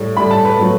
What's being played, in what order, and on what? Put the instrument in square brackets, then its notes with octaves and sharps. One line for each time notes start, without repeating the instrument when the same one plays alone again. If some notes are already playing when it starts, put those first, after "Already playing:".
Already playing: [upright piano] A2 G3
A2 B5
G3
A5
B4
A2 F#3 A3